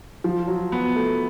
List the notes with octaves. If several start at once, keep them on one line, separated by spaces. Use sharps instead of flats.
F3
F#3
B3
A3